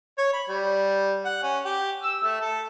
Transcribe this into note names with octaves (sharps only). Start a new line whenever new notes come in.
C#5
B5
G3
F#5
C#4
G4
E6
A3
A4